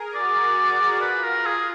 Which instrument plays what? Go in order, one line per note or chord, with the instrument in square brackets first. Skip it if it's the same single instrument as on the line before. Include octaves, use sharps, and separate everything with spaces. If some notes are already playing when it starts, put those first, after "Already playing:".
Already playing: [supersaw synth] G#4 A#4
[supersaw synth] F#4 [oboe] D5
[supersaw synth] A#4
F#4
[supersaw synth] F4 [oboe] B4
[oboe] A#4
G#4